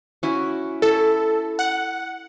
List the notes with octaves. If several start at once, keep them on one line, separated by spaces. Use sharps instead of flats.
C#4 E4 F#4
E4 A4
F#5